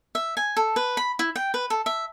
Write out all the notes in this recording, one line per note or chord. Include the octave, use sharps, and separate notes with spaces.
E5
G#5
A4
B4
B5
E4
G5
B4
A4
E5